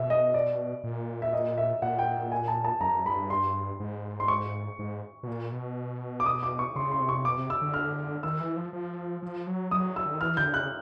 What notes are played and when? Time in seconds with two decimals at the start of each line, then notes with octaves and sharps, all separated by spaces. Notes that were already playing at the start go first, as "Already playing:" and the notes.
Already playing: B2 E5
0.10 D#5
0.34 D5
0.84 A#2
1.22 E5
1.33 D#5
1.58 E5
1.82 A#2 F#5
1.99 G5
2.32 G#5
2.48 A5
2.64 A5
2.81 F#2 A#5
3.05 G2 B5
3.30 C6
3.80 G#2
4.20 C6
4.28 C#6
4.79 G#2
5.23 B2
5.27 A#2
5.52 B2
6.20 D6
6.26 D#6
6.43 D6
6.59 C#6
6.76 C#3 C6
6.91 C6
7.00 C3
7.09 C#6
7.25 B2 D6
7.38 C3
7.50 E6
7.62 D3
7.74 F6
8.23 D#3 E6
8.40 E3
8.56 F3
8.73 F3
9.23 F3
9.47 F#3
9.71 F#3 D#6
9.96 E6
10.05 D3
10.14 D#3
10.21 E3 F6
10.37 D3 G6
10.54 C#3 F#6